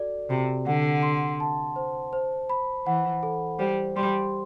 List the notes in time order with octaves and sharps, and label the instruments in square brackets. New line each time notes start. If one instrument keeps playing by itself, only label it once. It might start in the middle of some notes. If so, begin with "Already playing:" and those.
Already playing: [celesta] F#4 A4 D5
[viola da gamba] C3 [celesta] F#4
[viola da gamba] D3 [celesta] F#5
[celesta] C6
A5
C5
C5
B5
[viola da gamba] E3 [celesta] F#5
[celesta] A4
[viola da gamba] G3 [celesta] C5
[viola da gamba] G3 [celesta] C6